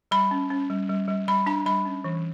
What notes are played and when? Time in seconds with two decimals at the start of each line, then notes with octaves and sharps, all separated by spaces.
0.11 G3 B5
0.31 C#4
0.50 C#4
0.70 G3
0.89 G3
1.08 G3
1.28 G3 B5
1.46 D4 A5
1.66 G3 B5
1.85 C#4
2.04 E3